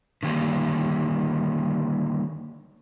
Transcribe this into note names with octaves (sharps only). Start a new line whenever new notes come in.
D3 D#3 G3 A#3